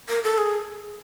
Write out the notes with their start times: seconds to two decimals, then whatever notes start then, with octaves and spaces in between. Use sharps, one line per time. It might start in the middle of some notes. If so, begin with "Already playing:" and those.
0.09 A#4
0.24 A4
0.38 G#4